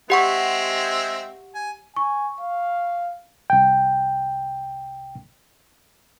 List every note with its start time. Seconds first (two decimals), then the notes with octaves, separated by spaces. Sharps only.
0.10 G#3 C4 G4 E5 F#5 C#6
1.55 G#5
1.96 G#5 C#6
2.41 F5
3.50 C2 G5